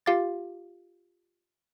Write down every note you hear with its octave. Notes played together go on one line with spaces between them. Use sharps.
F4 G4 F5 D6 A6